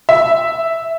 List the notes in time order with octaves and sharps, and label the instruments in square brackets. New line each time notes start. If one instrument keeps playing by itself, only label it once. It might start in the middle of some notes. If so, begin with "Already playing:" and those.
[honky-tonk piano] E5